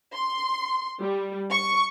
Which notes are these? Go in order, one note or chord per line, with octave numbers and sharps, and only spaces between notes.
C6
G3
C#6